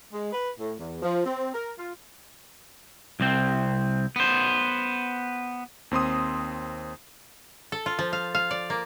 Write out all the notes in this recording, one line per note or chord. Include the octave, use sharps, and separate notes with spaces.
G#3
B4
A2
E2
F3
C4
A#4
F4
C2 C4
B3 C5
D#2 C4 C6 D#6
A4
F4
F3
F5
F5
D5
A#3